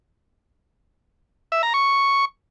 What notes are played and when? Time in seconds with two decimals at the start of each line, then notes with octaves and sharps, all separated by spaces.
1.52 E5
1.63 A#5
1.74 C#6